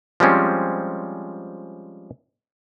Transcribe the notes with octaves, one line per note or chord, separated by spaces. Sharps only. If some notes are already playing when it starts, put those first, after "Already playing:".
F3 G3 G#3 C4 C#4